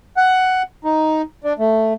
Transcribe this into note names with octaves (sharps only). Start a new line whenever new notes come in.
F#5
D#4
D4
A3